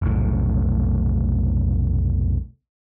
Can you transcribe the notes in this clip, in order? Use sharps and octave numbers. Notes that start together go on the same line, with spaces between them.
F1 B1 A2